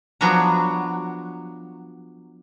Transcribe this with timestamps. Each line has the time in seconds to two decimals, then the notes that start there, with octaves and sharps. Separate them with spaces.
0.21 F3 F#3 B3 D4 F#4 A#5